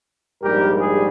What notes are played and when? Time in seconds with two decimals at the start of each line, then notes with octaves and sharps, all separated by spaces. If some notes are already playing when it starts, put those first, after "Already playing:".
0.43 A#1 G#2 G3 G4 A#4
0.81 G#4